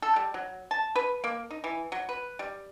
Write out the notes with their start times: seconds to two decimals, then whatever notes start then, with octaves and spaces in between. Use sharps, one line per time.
0.02 A4
0.16 G3
0.34 F#3
0.71 A5
0.96 B4
1.24 A#3
1.51 D#4
1.64 E3
1.92 F#3
2.09 B4
2.39 G3